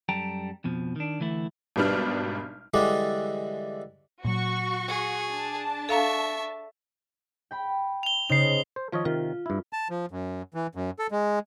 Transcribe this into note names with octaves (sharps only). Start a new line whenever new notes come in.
F#2 G3 A4 G5 A5 A#5
F2 B2 F3
D#3 D4
D2 E3 A3 E4
G#1 B2 G3 B3 D4 F6
D3 E3 G3 G#3 D4
A#2 F#3 F#4 C#6
G#4
D4 A5
A4 E5 F5 A#5 C#6
G5 B5
F7 G7
C#3 D#4 C5 C7 F7
C5
D#3 F3 F4 C#5 D#5
C3 D#3 F4
G2 E4
A5
F3
F#2
E3
F#2
A4
G#3